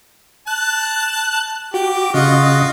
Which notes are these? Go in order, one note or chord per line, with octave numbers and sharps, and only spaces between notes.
A5 F#6
F#4 G4 D6
C#3 F4 F#4 D#5